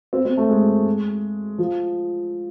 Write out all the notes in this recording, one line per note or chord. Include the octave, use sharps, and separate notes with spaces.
C4
C4
A3
G#3
F3